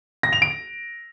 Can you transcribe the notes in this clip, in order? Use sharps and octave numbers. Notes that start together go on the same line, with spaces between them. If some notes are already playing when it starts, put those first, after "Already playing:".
A#6
F7
D7